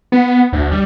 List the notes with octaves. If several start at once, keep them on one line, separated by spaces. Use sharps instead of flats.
B3
D2
G3